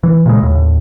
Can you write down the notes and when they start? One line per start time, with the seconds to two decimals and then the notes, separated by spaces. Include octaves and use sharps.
0.03 E3
0.26 A#2 C#3 G#3
0.42 D#2 A2